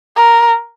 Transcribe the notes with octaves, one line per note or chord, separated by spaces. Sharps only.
A#4